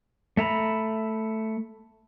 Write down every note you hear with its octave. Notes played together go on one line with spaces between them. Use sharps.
A3 E5 A#5 B5